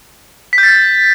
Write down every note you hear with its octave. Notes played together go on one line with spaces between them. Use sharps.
B6
G6
A6